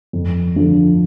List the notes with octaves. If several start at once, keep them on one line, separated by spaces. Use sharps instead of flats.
F2
D3 F3